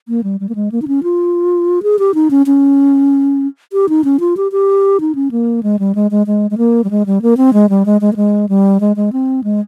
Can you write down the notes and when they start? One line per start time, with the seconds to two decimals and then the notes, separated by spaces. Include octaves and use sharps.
0.08 A#3
0.24 G3
0.40 G3
0.49 A#3
0.55 G#3
0.72 A#3
0.82 D#4
0.88 C#4
1.03 F4
1.83 G#4
1.99 G4
2.14 D#4
2.30 C#4
2.46 C#4
3.73 G4
3.89 D#4
4.04 C#4
4.20 F4
4.37 G4
4.52 G4
5.00 D#4
5.15 C#4
5.31 A#3
5.63 G#3
5.79 G3
5.95 G#3
6.11 G#3
6.27 G#3
6.51 G#3
6.58 A#3
6.84 G3
6.91 G#3
7.06 G3
7.22 A#3
7.37 C4
7.53 G#3
7.69 G3
7.86 G#3
8.01 G#3
8.13 A#3
8.16 G#3
8.49 G3
8.80 G#3
8.96 G#3
9.13 C4
9.44 G#3